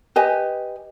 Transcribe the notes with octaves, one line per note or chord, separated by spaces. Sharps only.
G4 B4 D#5 G#5